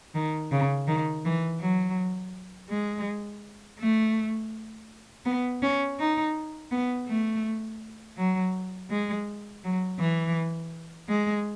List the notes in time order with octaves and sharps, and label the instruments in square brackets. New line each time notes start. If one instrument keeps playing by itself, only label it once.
[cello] D#3
C#3
D#3
E3
F#3
G#3
A3
B3
C#4
D#4
B3
A3
F#3
G#3
F#3
E3
G#3